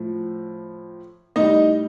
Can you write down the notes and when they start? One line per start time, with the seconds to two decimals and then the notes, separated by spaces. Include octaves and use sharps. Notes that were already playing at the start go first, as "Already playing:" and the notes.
Already playing: A2 F3
1.36 A2 G3 D#4 D#5